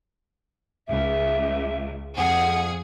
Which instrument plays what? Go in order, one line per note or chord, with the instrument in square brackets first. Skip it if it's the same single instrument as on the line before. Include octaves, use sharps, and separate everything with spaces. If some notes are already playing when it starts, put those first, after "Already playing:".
[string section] C#2 [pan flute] E5
[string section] F2 G#4 [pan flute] F#5